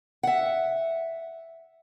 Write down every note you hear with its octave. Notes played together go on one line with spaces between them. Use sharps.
E5 F#5